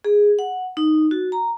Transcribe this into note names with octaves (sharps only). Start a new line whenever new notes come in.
G#4
F#5
D#4
F#4
A#5